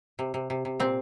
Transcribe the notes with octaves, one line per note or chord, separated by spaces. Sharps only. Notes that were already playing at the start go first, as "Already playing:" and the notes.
C3
C3
C3
C3
A#2 C4